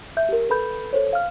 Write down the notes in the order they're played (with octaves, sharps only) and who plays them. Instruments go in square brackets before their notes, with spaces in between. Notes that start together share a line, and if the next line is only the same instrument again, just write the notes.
[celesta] E5 G6
G4 A#4
A4 B4 B5 G6
A4 C5 C#5
F5 F6